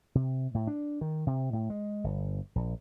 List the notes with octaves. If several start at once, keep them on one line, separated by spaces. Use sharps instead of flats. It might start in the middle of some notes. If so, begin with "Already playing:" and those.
C3
A2
D4
D#3
C3
A2
G#3
G1
A#1